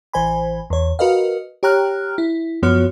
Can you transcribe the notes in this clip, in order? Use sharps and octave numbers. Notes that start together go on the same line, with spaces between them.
A1 E3 C5 G#5 B5
E2 C#5
F#4 A#4 B4 D#5 F5
G4 C#5 G5 A#5 F6 F#6
E4
F#2 F3 B3 F#4 C#5 F6